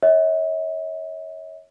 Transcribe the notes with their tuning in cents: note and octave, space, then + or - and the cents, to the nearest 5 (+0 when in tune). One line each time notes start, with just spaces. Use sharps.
C#5 +0 E5 -45